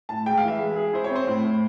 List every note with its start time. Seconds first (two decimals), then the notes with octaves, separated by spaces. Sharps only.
0.09 A2 A5
0.26 G#3 G5
0.37 F5
0.43 E3 E5
0.60 G#3
0.76 G#4
0.93 E4 C5
1.04 C#5
1.10 C4
1.15 C5
1.27 A2
1.44 A2